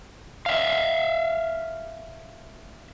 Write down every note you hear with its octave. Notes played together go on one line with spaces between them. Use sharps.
E5 F5